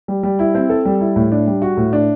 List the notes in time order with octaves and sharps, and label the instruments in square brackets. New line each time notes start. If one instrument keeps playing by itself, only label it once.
[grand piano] G3
G3
E4
C4
A4
G3
E4
A2
D4
G3
F#4
A2
D4